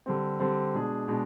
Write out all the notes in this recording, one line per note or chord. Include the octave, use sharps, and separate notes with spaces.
D3 G3 C4
D3 G3 C4
B2 G#3 D4 G#4
B2 G#3 D4